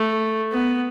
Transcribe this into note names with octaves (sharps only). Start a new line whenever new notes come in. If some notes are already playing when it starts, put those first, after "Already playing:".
Already playing: A3
B3